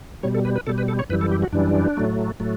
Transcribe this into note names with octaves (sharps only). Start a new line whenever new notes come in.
B2 G3 C#5
A4
B4
B4
B2 G3 A4
B4
A4
C#5
F#2 E3 G3 B4
A4
G4
F#4
F#2 E3 G3 D4
A2 F#3 A3
A2 F#3 A3